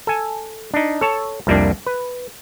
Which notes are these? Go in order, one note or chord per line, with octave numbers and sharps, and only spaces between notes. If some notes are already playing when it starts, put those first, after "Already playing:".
A4 G#5
D4 D#4
A4 C#5 A5
C2 F2 G3 A#3 D4
B4